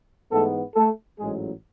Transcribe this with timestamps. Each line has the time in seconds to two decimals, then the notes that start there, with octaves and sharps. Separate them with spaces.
0.31 G#2 E3 A3 B3 A4
0.75 A3 A4
1.19 A1 G#2 F#3 G#3 G#4